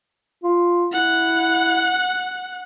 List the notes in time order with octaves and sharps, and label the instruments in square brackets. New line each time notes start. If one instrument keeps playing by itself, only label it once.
[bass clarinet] F4
[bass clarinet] E4 [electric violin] F#5